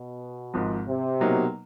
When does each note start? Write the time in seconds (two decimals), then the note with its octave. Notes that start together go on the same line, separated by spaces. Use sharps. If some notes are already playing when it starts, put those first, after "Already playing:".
Already playing: B2
0.54 G#1 G#2 F3
0.87 C3
1.20 B2 F#3 A#3 D#4